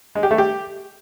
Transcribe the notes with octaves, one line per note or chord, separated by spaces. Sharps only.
G#3
G4
A3
G4